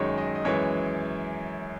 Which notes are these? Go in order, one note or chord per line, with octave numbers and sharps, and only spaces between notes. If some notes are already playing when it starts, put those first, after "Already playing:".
Already playing: F#2 D#3 G#3 C#5
D#5
D#5
F#2 E3 G#3 C#5